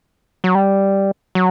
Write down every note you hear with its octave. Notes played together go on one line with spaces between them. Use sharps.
F#3
G3
F#3